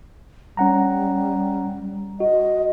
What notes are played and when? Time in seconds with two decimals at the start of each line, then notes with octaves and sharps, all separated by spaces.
0.57 G3 C#4 F#5 A#5
2.20 F#4 D#5